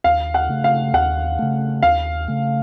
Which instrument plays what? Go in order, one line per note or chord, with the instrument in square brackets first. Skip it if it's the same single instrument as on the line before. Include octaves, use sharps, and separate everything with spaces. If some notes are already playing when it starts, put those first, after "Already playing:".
[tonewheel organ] D#2 [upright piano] F5
[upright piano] F#5
[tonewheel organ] C#3 A3
[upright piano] F5
[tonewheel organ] D#2 [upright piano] F#5
[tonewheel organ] C#3 A3
[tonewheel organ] D#2 [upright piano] F5
[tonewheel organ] C#3 A3